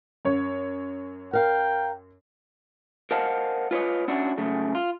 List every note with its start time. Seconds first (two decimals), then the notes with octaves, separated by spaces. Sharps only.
0.25 F#2 C#5
1.33 A#4 F5 G5
3.11 A#4 C5 D#5 F5 F#5 A5
3.71 F4 B4 C#5 D#5
4.08 C#4 D4 E4 F#4
4.38 F#2 C#3 A3
4.75 F4